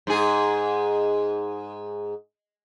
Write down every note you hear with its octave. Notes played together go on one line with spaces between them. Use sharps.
G#2 G#4